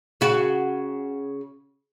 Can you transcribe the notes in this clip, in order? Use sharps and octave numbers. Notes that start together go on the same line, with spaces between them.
C#3 F#4